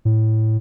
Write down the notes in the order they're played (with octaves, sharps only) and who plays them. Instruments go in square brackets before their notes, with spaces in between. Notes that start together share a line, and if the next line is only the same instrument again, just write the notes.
[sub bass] A2